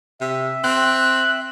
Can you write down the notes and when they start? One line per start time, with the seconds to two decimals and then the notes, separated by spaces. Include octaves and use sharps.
0.21 C3 E5
0.64 C4 F#6